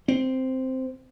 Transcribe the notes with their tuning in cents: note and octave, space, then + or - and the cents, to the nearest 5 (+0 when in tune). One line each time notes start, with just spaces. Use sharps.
C4 -5